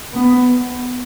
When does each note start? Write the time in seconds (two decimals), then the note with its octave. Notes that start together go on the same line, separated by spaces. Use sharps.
0.14 B3